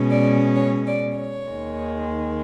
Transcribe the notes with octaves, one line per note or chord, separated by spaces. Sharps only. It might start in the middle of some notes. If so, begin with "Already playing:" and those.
Already playing: B2 G#3 C#4
D5
C#5
D5
C#5
D#2 D#3 G#3